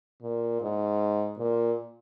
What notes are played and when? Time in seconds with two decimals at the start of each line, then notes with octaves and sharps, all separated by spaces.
0.22 A#2
0.62 G#2
1.38 A#2